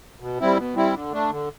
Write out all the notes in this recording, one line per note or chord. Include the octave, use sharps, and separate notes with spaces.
B2
G3 C4 E4
B2
G3 C4 E4
D3
A3 D4
D3